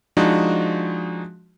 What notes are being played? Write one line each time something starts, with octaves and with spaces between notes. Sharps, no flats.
F3 G#3 D4 D#4 F#4